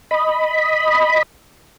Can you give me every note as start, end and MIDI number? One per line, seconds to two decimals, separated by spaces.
0.11 1.23 75
0.11 1.23 83